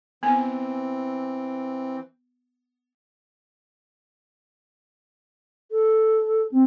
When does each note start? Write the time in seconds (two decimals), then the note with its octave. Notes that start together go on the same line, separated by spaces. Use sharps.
0.23 E3 B3 C4 G#5
5.71 A4
6.51 C4